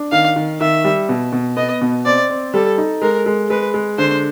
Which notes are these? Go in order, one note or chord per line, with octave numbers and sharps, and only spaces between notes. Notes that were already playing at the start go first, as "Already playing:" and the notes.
Already playing: D4
D#3 F5
D#3
D#3 E5
G3
B2
B2
B3 D#5
B2
C4 D5
C4
G3 A4
D#4
G#3 A#4
G#3
G#3 B4
G#3
D3 C5